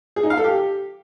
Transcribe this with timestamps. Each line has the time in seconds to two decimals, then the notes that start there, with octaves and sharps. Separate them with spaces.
0.16 G#4
0.23 D#4
0.30 F5
0.37 A4
0.44 G4